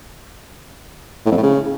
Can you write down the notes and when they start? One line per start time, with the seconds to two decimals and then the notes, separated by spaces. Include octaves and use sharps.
1.26 A2
1.32 F2
1.37 A2
1.43 C#3